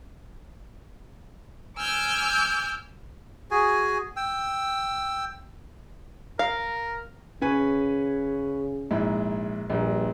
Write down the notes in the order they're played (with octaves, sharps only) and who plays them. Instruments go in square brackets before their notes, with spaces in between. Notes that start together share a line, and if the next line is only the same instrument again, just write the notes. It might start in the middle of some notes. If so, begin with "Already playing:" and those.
[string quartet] G#5 D6 E6 F6 G6
[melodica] F#4 G#4 G#5
G5 E6
[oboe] A#4 [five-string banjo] F5
[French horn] C#3 [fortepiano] C#4 B4 G#5
[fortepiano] A#1 G#2 E4
[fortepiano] A#1 A#2 [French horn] G2